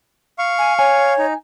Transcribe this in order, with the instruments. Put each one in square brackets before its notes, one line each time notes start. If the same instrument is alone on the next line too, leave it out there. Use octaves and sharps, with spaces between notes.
[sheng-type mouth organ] F5 C#6
[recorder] G#5
[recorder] C#5 [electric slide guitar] G#5
[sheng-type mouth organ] D#4